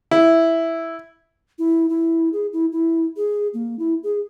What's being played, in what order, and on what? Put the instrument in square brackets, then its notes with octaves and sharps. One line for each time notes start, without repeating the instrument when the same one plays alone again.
[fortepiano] E4
[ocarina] E4
E4
G#4
E4
E4
G#4
A#3
E4
G#4